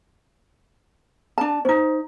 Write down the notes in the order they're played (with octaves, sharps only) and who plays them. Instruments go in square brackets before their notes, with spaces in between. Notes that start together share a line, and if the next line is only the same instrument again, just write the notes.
[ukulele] D4 A5
[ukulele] C#4 D#4 [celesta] C5